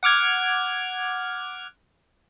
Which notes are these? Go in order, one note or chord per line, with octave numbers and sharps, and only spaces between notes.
F#5 D6 F6 G#6